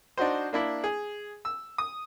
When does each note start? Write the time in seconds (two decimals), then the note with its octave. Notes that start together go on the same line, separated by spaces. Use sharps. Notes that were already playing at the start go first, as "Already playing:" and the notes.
0.18 D4 D#4 F#4 C5
0.53 A#3 D4 E4
0.84 G#4
1.45 E6
1.78 D#6